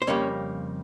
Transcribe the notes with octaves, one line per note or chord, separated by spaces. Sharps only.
C5
F2 C#3 G3 A#3 C#4 C#5